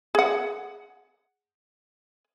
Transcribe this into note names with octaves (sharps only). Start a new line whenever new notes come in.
G#4 F#5